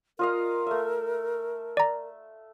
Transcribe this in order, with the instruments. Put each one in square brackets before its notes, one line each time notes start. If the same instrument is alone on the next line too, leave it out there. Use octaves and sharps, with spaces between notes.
[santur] F4 D#5 F5 [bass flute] A#4
[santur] A3 E5
[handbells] D5 A#5